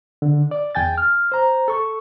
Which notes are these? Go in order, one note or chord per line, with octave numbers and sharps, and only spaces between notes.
D3
D5
E2 G5 G#5 A6
F6
C5 A#5
A4 C#6